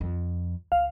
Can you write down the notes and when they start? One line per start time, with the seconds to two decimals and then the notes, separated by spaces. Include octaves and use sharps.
0.01 F2
0.72 C#2 F5